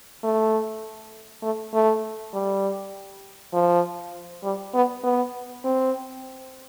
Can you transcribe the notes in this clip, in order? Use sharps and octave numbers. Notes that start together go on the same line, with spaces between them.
A3
A3
A3
G3
F3
G3
B3
B3
C4